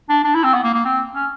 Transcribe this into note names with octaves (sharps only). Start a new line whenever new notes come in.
D4
D4
E4
C4
B3
A#3
A#3
C4
C#4